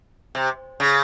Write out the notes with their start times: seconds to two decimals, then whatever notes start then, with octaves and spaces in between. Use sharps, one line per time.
0.35 C3
0.80 C#3